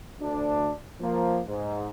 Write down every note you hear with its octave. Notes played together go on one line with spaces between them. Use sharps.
D2 D4
F3 A#3
G#2